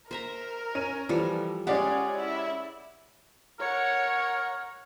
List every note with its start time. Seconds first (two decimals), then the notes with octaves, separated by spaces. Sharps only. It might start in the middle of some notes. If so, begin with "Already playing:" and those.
0.11 A#4 C5 E5 A#5
0.75 C#4 D#7
1.09 E3 F3 G3 A4
1.67 G#3 C#4 G4 G#4 D5 F5 F#5
2.17 E4
3.60 A#4 C#5 F#5